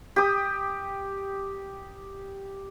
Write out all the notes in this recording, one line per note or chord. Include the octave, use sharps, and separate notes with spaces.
G4 D#6